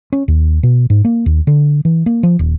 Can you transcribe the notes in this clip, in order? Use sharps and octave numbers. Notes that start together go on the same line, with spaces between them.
C#4
D#2
B2
G#2
A#3
D#2
D3
E3
A#3
F3
D#1